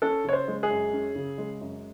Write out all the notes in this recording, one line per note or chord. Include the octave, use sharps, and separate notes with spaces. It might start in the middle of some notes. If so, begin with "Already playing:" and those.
C#4 A4
C#3 C#5
C5
G#3
G#4
F#2
C#4
C#3
G#3
F#2